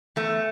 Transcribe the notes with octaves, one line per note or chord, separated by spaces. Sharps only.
E2 A3